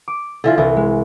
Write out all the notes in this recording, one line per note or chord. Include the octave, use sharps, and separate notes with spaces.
D6
D3 E3 F4
C2 E3
G#3